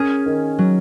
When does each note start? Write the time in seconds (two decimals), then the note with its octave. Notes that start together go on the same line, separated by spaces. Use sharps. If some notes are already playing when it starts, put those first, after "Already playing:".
Already playing: C#4 G#4 A#4
0.26 D#3
0.58 F#3